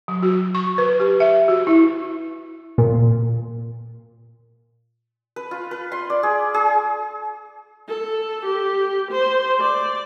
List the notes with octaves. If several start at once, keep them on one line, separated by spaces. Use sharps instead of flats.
F#3
F#4
C#6
B4
G4
E5
F#4
E4
A#2
B4
F4
B4
C6
D5
G#4
G#4
A4
G4
C5
D5